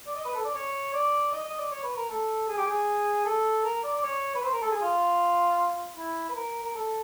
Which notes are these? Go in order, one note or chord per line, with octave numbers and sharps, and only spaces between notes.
D5
D#5
B4
A4
D5
C#5
D5
D#5
D#5
D5
C#5
B4
A#4
A4
G#4
G4
G#4
A4
A#4
D5
D5
C#5
B4
C5
A#4
A4
G#4
F4
E4
B4
A#4
A#4
A4